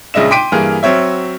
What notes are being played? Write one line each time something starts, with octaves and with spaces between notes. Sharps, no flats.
A#1 C#3 G#3 D#5 E5 E7
G5 C6 D6 B6 D7 D#7
G2 E3 A#3 G#4 F6
F#3 C4 C#5 E5